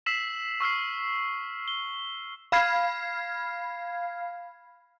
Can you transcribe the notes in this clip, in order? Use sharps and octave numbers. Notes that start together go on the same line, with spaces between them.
E6 B6 C7 E7 F#7
C#6 E6 F6 C7
G7
F5 B5 F6 G#6 C7